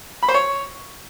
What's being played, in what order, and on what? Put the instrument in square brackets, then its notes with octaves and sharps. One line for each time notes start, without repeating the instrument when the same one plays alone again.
[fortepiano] B5
C5
C#5